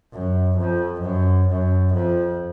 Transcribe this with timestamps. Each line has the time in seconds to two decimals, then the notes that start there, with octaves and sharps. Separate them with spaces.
0.13 F#2
0.58 F2
1.03 F#2
1.49 F#2
1.94 F2